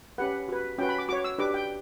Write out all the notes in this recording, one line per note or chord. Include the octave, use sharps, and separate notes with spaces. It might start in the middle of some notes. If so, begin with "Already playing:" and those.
C#4 G4 B4 F#5
F#4 B4
C#4 F#4 B4 G5
B5
D6
F#4 C#5 D6
E6
D4 G4 B4 D6
G5